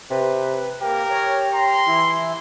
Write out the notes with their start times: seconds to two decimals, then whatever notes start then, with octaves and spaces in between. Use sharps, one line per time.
0.11 C3 B4
0.82 A#3 G4 A#4
1.10 C#5
1.53 A#5 C6
1.88 E3 E4